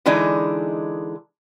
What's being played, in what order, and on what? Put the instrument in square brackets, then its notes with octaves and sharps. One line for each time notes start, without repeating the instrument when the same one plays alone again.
[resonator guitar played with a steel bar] D3 E3 G#3 D4 D#4